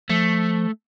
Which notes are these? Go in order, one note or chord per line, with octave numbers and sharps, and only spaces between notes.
F3 A3